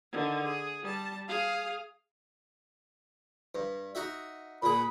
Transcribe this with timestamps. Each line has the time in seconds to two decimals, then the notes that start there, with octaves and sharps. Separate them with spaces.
0.12 D3 D#3
0.43 G#4
0.83 G3 A5
1.28 G#4 F5
3.55 G2
3.95 D#4 F#4 E5
4.63 A#2 G#4 B5